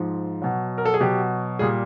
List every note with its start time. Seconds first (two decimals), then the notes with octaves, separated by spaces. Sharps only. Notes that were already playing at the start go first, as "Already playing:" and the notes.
Already playing: G#2 F3
0.42 B2 F#3
0.78 A#4
0.86 A4
0.94 G#4
1.00 B2 F#3 G4
1.59 A#2 G3 G#4